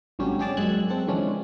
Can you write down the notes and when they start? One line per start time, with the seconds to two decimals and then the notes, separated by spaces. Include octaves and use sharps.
0.19 G#1 D3 F#3 G3 C#4 G4
0.39 C#4 G4 G#4 D5 A5
0.57 F#2 A#2 G#3 E6 F#6 G#6
0.90 C4 A4
1.07 D3 E3 F3 G#3 C#4 D4